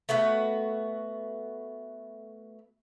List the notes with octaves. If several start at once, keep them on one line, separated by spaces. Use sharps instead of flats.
A3 B3 F#4 B4